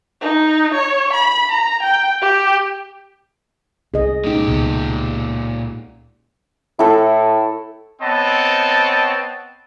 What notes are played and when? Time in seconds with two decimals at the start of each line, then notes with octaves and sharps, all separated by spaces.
0.21 D#4
0.74 C#5
1.13 B5
1.51 A#5
1.83 G5
2.21 G4
3.94 C2 G#4 D#5
4.25 A#2 G#3 C#4 D#4 G4
4.47 C#2 B2
6.79 A2 E4 A4
8.02 B3 C4 C#5 D#5 A5